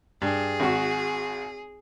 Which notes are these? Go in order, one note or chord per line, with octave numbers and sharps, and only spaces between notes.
G2 G#4
G#1 F#4